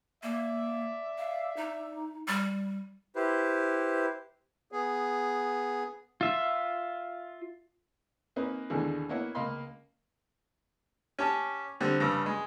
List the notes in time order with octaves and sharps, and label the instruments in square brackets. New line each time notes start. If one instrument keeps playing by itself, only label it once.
[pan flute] A#3 [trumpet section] D5 E5
[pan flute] F5
D#4
G3
[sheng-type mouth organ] E4 G4 B4 C5
[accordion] B3 G#4
[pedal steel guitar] F4 E5
[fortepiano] A#3 C4 C#4 D#4 B4
D#2 B2 D3 E3 G#3
A#3 B3 E4 C#5 D#5 F#5
C#2 A#3 D#5 F5 B5 C6
C#4 G4 A5
D3 G3 C4
G2 C#3 D6 E6
G#3